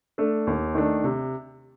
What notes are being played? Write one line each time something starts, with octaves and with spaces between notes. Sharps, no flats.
A3 D4 A4
D#2
D#3 A3 D4
C3